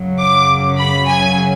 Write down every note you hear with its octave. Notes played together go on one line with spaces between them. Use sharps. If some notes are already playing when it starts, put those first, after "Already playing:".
Already playing: F#2 C#3 F#3
D6
B5
G#5